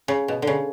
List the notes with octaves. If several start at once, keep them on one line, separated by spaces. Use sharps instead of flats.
C#3
B2
D3
C#3